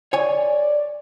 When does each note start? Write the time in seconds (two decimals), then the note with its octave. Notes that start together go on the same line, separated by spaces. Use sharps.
0.13 C#5 D5 G#5